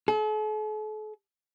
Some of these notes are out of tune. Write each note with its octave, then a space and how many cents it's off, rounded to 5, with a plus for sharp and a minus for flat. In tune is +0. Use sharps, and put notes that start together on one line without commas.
A4 -45